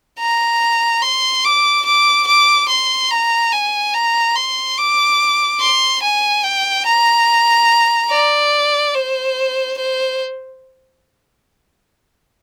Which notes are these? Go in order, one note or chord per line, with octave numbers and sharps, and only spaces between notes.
A#5
C6
D6
D6
D6
C6
A#5
G#5
A#5
C6
D6
C6
G#5
G5
A#5
D5
C5
C5